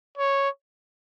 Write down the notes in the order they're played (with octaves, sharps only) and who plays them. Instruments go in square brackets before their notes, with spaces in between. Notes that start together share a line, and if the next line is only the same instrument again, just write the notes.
[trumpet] C#5